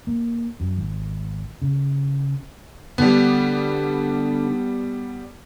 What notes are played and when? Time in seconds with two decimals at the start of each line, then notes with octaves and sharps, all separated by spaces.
0.07 A#3
0.60 F#2
0.77 G#1
1.62 C#3
2.98 D3 G3 B3